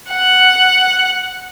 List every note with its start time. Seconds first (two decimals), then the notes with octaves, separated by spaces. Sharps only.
0.11 F#5